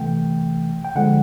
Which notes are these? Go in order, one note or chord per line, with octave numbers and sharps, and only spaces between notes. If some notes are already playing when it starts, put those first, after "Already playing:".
Already playing: C3 E3 A3 G5
G5
D3 F3 G#3 F#5